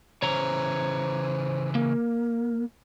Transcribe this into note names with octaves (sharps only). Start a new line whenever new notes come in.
C#3 E3 C5 C#5 A#5
A#3 A#4